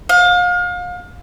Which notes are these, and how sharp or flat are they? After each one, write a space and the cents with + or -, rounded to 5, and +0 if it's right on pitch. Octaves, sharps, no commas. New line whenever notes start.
F5 +35